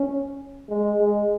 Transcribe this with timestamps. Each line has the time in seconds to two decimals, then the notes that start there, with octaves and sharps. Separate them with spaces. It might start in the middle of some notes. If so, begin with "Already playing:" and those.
Already playing: C#4
0.70 G#3
1.00 G#3